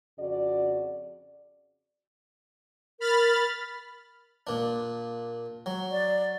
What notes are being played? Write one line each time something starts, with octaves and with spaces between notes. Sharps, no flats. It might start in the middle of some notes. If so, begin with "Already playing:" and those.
F2 C#3 F#4 D5
A#4 B5 F6 A6
A#2 D4
F#3
D5